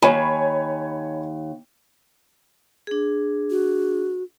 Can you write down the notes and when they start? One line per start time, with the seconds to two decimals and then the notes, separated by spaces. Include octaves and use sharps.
0.02 D#2 C#5 G#5 B5
2.87 D4 G#4
3.50 F#4